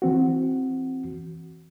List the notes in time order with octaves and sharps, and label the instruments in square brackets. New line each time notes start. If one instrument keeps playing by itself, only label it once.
[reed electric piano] E3 C4 F#4